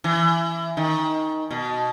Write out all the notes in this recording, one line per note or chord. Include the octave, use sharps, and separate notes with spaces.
E3
D#3
B2